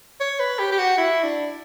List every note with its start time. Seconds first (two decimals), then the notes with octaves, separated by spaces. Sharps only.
0.20 C#5
0.40 B4
0.59 G4
0.72 G4
0.78 F#4
0.98 E4
1.23 D4